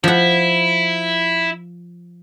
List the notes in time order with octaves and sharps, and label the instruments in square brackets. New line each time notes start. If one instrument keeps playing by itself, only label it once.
[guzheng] F3 F#5 [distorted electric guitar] E4